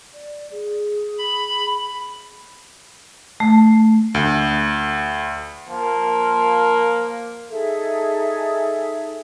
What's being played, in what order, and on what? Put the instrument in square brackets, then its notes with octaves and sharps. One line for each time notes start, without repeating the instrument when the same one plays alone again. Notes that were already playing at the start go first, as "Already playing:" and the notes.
[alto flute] D5
G#4
[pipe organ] B5
[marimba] A3
[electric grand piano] D2
[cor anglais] F3 [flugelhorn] A#3
[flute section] D#4 G#4 A4 E5